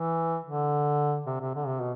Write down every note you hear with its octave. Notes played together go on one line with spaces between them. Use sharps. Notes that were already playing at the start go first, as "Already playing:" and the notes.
Already playing: E3
D3
C3
C3
D3
C3
B2